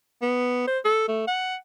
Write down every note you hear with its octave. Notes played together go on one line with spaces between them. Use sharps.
B3
C5
A4
A3
F#5